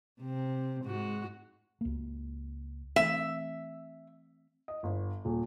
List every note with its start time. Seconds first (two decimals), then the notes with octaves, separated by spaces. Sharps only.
0.20 C3 C4
0.84 G#2 G#3 F#4
1.81 C#2 A#3
2.96 E3 A3 C4 E5
4.68 D#5
4.83 G1
5.25 D#1